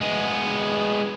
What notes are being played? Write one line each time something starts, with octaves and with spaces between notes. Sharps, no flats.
G#3 B3